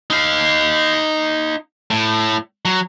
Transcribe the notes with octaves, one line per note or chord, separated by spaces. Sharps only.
D#4 F5
A2
F#3